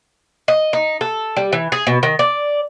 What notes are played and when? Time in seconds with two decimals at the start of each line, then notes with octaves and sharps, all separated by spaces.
0.48 D#5
0.73 D#4
1.01 A4
1.37 G3
1.53 E3
1.72 G#4
1.87 B2
2.03 D#3
2.19 D5